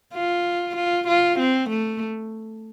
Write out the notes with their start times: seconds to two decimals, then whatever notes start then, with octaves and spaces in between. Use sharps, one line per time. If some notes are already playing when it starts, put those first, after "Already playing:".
0.14 F4
0.76 F4
1.08 F4
1.39 C4
1.70 A3